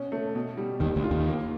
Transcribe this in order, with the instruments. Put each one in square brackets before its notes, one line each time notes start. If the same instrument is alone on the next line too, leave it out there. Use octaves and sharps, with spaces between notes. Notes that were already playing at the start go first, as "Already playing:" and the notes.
Already playing: [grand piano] B2 C#4
A3
B2
G3
[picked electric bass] D#2 D#3 [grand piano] G3
[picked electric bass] D2 D3
[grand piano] F4
[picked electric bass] D#2 D#3
[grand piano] A#3